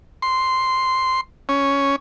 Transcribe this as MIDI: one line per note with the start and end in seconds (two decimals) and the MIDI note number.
0.22 1.21 84
1.49 1.96 61